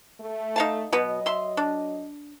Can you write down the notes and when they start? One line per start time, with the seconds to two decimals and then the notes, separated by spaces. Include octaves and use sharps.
0.21 A3
0.56 D#4 F5 A5
0.93 B2 F#3 B3 D#5
1.26 E5 C6
1.57 D4